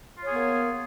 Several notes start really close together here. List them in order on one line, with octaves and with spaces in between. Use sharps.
F4 C#5 G#4 B3 A#3